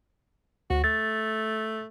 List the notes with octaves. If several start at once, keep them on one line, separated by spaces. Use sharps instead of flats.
D2 F#4
A3 A6